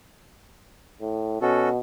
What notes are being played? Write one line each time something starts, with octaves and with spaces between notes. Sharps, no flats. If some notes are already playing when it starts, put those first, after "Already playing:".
A2
B2 C#4 F#4 A4